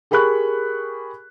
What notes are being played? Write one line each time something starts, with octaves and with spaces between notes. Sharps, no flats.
G4 G#4 A#4 B5 C#6 F#6